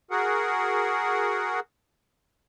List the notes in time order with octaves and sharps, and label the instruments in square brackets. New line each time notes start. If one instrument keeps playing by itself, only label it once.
[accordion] F#4 G#4 A#4 F#5